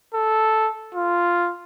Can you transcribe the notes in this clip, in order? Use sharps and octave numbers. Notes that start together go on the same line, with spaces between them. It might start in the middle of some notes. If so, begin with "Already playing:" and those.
A4
F4